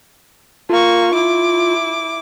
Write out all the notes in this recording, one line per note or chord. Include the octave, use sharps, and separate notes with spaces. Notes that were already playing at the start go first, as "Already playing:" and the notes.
A#3 F4 C#6
E4 D6